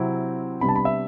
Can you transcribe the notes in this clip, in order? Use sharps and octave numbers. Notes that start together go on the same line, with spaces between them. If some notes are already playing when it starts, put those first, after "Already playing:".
Already playing: C3 F#3 C4 E4
C3 G3 B3 D4 B5
A5
B5
E5